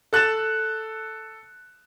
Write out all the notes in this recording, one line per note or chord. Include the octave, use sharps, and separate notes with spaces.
A4 F#6 A6 E7